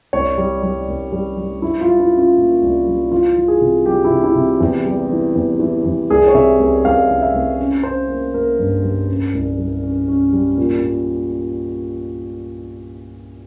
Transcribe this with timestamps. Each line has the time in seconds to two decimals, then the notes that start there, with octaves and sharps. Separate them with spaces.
0.13 C2 C#5
0.38 G3
0.63 G3
0.88 C2
1.12 G3
1.37 G3
1.62 G3 E4
1.81 F4
1.87 G3
1.99 E4
2.12 C#4
2.19 F4
2.37 A#2
2.62 C2
2.87 G3
3.12 E3 F4
3.36 E3
3.48 G#4
3.61 C3
3.86 G3 G4
4.04 E4
4.10 C3
4.24 E4
4.35 C3
4.60 E2 G4
4.85 G3
5.10 E3
5.35 E2
5.60 E3
5.85 E2
6.10 C2 G#4
6.28 C#5
6.34 C3 E5
6.60 C2
6.85 C2 F5
7.09 C2
7.22 E5
7.34 C2
7.59 C#4
7.83 C#4 C5
8.08 A#3
8.34 A#3 A#4
8.59 G2
8.84 G3
9.08 C#4
9.33 C2
9.58 G3
9.83 C#4
10.08 C#4
10.33 G3
10.57 A#2
10.83 A#2